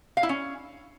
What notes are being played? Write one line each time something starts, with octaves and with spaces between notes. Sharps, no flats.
F5
E4
C#4